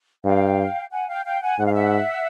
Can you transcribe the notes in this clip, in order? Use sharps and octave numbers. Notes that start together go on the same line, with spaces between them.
G2 F5 G5
F#5 G#5
F5 G5
F5 G5
F#5 G#5
G#2 F#5
F5
E5 F#5